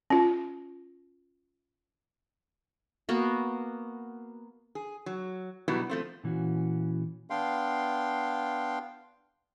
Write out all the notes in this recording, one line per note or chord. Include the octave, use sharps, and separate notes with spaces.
C#4 F4
A#3 B3 F#4
G#4
F#3
B2 F#3 G3 B3 E4 F#4
F3 A3 C4
A#2 E3 C#4 F#4
B3 D4 F5 G5 C6